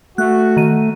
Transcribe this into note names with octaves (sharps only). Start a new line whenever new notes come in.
A3 F#4 F#6
D#3 D#7